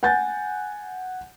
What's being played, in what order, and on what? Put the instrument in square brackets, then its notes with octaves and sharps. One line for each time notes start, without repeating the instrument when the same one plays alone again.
[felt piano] F#5 G#5 G6 A6